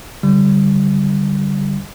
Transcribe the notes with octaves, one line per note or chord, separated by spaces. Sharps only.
D3 G3